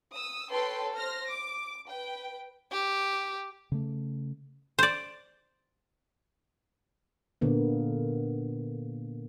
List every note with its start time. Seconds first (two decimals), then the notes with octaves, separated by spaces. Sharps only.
0.12 D#6 E6
0.51 A4 B4 C#5 G5 C6
0.95 C5 F6 A#6
1.29 D6
1.89 B4 G5
2.72 G4
3.72 C#3 A3
4.79 C5 D5
7.41 A#2 D3 A#3 B3